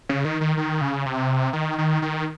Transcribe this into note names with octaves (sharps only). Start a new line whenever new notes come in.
C#3
D#3
D#3
D#3
C#3
C3
D#3
D#3
D#3